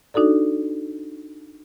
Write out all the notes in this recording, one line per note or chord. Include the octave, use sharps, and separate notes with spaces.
D4 D#4 F#4 A4 D5